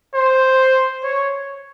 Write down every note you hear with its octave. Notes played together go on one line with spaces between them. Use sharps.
C5
C#5